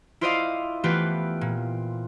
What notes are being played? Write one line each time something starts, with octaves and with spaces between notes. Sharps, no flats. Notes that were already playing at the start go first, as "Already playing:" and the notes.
E4 F4 C5 D5 D#5 F5
E3 A3 B3 F4 G4 B4
A#2